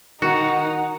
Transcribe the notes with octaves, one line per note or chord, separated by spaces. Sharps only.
D#3 D#4 F#4 F#5 C#7